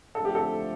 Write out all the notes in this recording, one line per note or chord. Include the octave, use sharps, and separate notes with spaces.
D3 F3 A3 A4
G4
A4